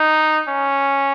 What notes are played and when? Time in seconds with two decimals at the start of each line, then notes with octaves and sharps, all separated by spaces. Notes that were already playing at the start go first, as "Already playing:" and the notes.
Already playing: D#4
0.48 C#4